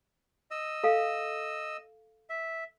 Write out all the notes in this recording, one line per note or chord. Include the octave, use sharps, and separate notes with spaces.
D#5 E6
A4 F5
E5